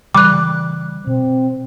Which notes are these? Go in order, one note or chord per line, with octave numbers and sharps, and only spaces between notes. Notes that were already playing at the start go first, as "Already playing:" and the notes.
C#3 E3 G3 D6 F#6
B2 C4